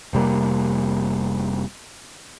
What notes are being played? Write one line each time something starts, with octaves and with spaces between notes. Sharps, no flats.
F1 C3 G3 A#3